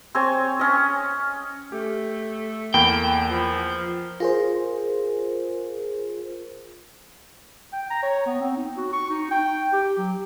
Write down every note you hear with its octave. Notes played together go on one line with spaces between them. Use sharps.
C4 C#5 G#5
C#4 D#5
A3 G4
E2 A#3 G5 B5
F3
F4 G#4 A#4 C5
G5
A#5
C#5
B3
C4
D#4
F#4
C#6
D#4
G5
G4
F#3